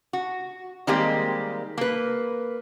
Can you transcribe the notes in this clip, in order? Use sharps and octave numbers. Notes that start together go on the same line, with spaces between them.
F#4
D#3 G3 G#3 A#3 C4 G4
A#3 B4